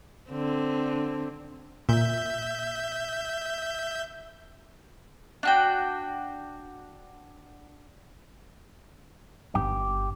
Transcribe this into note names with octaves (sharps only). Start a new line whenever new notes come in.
D3 C4
A#2 E5 G6
D4 F#4 G5
G1 G4